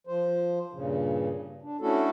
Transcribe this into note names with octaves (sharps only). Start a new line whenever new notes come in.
F3 C5
G2 A#2 C#3
D4
A3 C#4 D4 E4 F#4 A4